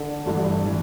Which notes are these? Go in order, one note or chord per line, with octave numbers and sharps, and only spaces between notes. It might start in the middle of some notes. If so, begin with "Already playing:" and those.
Already playing: D3
G1 G2 E3 A3 D4
E3 A3